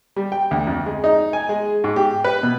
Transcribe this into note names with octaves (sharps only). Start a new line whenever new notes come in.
G3
G5
D2
F2
G#3
D#4
G#5
G#3
G#2
G4
B4
B2